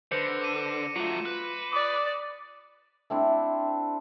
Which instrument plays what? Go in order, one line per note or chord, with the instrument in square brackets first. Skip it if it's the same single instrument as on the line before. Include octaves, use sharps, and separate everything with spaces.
[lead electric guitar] D3 [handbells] B4 C5 [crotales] A#6 C#7
[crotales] D6 D#7
[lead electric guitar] F#3 A3 [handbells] F4 [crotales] D6
[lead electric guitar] B4
[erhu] D5 [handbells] D#6
[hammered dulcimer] A3 C4 D4 E4